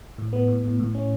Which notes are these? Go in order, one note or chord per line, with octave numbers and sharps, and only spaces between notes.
A2
B3
A2
A2
A2
C#4